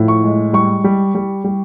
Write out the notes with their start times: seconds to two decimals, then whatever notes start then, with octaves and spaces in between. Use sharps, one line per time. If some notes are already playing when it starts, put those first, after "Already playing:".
Already playing: A2 F3
0.08 C#6
0.24 G#3
0.53 G3 C#6
0.84 G3
1.15 G3
1.44 G3